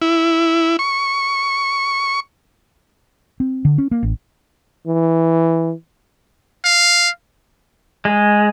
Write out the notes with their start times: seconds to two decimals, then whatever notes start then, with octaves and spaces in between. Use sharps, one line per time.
0.02 E4
0.79 C#6
3.40 C4
3.65 D3
3.78 C#4
3.91 A#3
4.03 A1
4.87 E3
6.64 F5
8.05 G#3